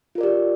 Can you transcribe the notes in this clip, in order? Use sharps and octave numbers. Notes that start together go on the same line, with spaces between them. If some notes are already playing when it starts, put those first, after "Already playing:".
F4 G4 A#4 D5